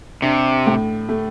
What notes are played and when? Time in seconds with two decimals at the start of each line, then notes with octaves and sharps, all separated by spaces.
0.22 C3 D4
0.66 A2
1.09 A3